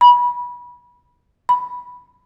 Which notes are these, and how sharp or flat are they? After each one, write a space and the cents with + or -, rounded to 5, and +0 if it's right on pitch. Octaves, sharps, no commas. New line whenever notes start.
B5 -25
B5 +0